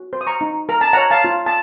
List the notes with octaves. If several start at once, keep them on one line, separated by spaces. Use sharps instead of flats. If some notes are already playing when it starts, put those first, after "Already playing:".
Already playing: F#4
C5
D#6
A#5 C#6
D#4
A#4 A#5
A5
C#5 F#5 A#5
F5 A5
F4
A5